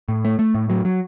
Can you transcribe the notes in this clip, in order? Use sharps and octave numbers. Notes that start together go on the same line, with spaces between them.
A2
A3
A3
A2
F#3
F#3